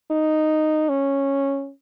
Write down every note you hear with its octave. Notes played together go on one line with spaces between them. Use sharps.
D#4
C#4